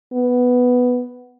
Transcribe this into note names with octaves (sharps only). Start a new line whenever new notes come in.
B3